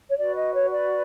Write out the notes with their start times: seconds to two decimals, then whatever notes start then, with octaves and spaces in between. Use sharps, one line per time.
0.08 C#5
0.17 F#4 B4 D5
0.36 D#5
0.53 C#5
0.70 D5